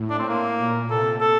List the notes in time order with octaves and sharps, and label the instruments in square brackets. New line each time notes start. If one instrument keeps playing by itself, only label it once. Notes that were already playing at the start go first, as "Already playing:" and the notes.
Already playing: [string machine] A2
[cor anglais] D4
C4
A#3
[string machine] A#2
[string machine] C3 [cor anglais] A4
[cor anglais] A4